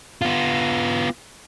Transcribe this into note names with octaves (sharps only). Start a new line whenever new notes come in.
B3 F4